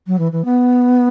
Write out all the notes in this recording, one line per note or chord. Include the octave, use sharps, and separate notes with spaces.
F#3
E3
E3
B3